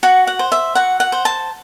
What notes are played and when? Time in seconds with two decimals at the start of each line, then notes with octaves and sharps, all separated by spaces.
0.03 F#4 F#5
0.27 F#5
0.39 C5
0.52 E5
0.75 F#4 F#5
1.00 F#5
1.12 C5
1.25 A5